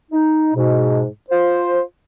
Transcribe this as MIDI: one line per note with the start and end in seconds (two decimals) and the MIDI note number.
0.12 0.50 63
0.54 1.04 44
0.54 1.04 47
1.30 1.80 65
1.30 1.80 72